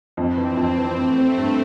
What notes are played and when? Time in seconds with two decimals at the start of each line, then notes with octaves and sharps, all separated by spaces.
0.17 F2 C4
0.37 E3
0.57 F2
0.77 E3
0.98 E3 A3
1.18 C4
1.38 G2